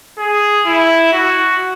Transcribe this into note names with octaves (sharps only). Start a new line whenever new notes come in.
G#4
E4
F#4